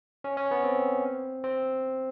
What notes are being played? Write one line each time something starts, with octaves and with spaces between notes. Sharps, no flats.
C#4
C#4
B3
C4
C4